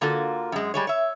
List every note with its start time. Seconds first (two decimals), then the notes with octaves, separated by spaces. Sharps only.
0.01 D3 A#3 F4 F#4 A4
0.52 F#2 G#3
0.74 G3 G#3 C#5
0.87 C#5 E5